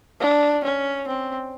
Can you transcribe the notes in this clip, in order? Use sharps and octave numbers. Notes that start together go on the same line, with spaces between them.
D4
C#4
C4